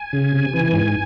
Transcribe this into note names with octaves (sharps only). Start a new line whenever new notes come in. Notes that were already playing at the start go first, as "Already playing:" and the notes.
Already playing: G#5
C#3
C3
E3
G#2